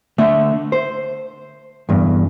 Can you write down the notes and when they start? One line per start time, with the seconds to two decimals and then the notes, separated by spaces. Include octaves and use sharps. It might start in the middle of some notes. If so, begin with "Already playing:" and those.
0.18 D3 A3 E5
0.72 C5
1.89 E2 G2